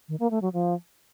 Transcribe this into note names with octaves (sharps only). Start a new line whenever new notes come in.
D#3
A#3
A3
F#3
F3